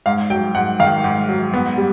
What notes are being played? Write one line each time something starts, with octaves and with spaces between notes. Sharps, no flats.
G#2 F5
F#3 G5
G#2 F#5
D#3 F5
G#2
F#3
B3
G3